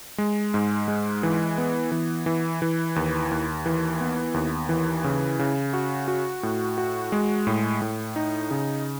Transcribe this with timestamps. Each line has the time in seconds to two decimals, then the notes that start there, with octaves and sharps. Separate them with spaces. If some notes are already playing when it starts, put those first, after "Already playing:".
0.18 G#3
0.54 G#2
0.88 G#3
1.23 E3
1.58 B3
1.92 E3
2.26 E3
2.62 E3
2.96 D#2
3.31 D#2
3.66 E3
4.01 B3
4.34 D#2
4.69 E3
5.04 C#3
5.39 C#3
5.74 F#4
6.08 F#4
6.43 A2
6.78 F#4
7.12 G#3
7.47 A2
7.82 A2
8.16 D#4
8.51 C#3